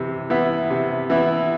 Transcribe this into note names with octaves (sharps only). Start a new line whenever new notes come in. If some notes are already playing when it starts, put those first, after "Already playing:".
Already playing: C3 E3
E3 B3 E4
C3
E3 B3 E4